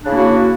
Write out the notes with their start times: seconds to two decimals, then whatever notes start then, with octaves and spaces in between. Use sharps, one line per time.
0.02 D4
0.05 C#3
0.08 E4
0.11 A#3
0.14 F#4